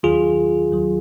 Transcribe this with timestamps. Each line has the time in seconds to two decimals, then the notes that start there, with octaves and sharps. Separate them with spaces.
0.03 D#2 D#3 F#3 F4 G#4
0.73 D#2 D#3 F#3